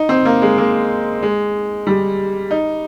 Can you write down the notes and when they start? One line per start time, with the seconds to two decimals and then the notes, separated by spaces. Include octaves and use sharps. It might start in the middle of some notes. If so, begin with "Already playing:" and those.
Already playing: D#4
0.09 C4
0.25 A#3
0.42 G#3
0.58 A#3
1.23 G#3
1.87 G3
2.51 D#4